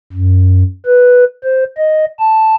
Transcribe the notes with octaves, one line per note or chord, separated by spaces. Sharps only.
F#2
B4
C5
D#5
A5